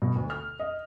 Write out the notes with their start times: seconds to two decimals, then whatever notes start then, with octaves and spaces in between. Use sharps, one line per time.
0.02 B2
0.15 D2
0.30 F6
0.59 D#5